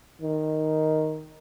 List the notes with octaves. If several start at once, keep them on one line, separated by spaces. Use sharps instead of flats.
D#3